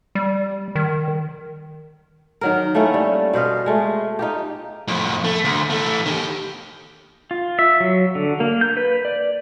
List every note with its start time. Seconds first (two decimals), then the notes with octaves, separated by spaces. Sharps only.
0.15 G3
0.75 D#3
2.41 D#3 F#3 A#4
2.75 A3 A#3 C#4 E4
2.94 G3
3.34 B2 C5 D#5 F5
3.66 G#3 A3
4.19 D#4 F4 G4
4.88 F2 A2
5.24 A3
5.44 D2
5.70 E3 A3
6.06 D#3 G4
7.31 F4
7.59 E5
7.80 F#3
8.15 D3
8.40 A#3
8.61 G6
8.77 B4
9.05 D5